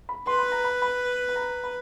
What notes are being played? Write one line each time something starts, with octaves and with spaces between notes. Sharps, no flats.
B5
B4 C6
B5
A#5
B5
B5
B5
A#5
B5